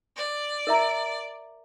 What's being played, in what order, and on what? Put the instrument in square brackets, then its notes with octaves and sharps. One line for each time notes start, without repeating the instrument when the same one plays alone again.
[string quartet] D5
[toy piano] A#4 E5 A#5